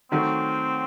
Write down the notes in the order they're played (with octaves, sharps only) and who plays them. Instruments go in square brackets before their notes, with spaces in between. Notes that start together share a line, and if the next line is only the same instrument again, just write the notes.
[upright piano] D#3 F#3 A3 [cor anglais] C4